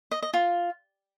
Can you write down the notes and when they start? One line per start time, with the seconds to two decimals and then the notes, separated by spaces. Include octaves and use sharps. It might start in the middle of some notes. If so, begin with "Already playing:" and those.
0.11 D#5
0.22 D#5
0.34 F4